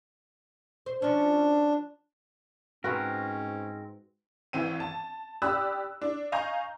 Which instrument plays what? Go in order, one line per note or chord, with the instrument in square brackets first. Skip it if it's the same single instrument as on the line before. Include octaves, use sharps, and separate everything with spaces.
[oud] C5
[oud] F3 C#4 [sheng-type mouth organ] D4
[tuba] G#2 [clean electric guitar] C4 A#4 [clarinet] C#4 [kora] F#4 B4
[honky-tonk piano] G#1 E3 C4 D#7
A5
G4 D5 B5 D#6 E6 F#6
D4
D#5 F5 G#5 A#5 C#6 G6